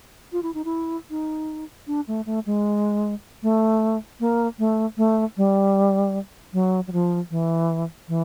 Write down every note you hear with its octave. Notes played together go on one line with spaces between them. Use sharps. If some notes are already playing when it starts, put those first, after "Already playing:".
F4
E4
D#4
E4
D#4
D4
A3
A3
G#3
A3
A#3
A3
A3
G3
F#3
F#3
F3
E3
E3